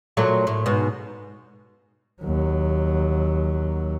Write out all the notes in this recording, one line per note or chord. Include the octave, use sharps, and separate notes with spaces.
A#2 F#3 A3
A2
G#2 B2
D#2 F#3